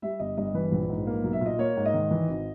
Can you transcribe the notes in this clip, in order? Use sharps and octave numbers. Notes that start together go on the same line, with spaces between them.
G3 E5
G1 D#5
G2 D#5
E3 B4
A#1
G#2
A#3
B1
E5
A#2 D#5
A#3 C#5
G#2
D#5
D#3
E3
G#1